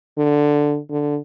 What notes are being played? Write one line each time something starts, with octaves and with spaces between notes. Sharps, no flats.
D3
D3